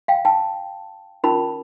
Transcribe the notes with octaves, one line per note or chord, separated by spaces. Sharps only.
F5 G5
G5 A5
C#4 F4 A#4 A5 B5